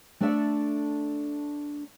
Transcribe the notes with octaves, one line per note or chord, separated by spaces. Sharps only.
A3 D4 A4 D5 E5